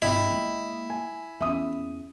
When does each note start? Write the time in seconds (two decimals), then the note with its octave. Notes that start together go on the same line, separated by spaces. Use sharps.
0.02 G1 E4 D#5 G5
0.31 G#3 A#3
0.90 G#5
1.41 E2 C#4 E5 D#6